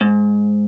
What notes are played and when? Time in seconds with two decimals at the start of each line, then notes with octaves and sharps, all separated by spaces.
0.01 G#2